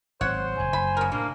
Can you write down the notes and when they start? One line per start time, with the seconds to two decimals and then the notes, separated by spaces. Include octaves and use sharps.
0.21 G#1 F#3 C4 C5 C#5 F#5
0.56 F#1 F2 G#5
0.73 F#1 B5
0.97 C#3 A#4
1.12 A2 C3 G3 A#3 D4